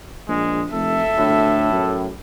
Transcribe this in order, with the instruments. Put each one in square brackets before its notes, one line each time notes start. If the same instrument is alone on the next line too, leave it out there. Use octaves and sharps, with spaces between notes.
[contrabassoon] A#1 [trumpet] G#3
[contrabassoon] F1 [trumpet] A4 [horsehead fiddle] E5
[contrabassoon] D2 [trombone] A2
[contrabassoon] F#2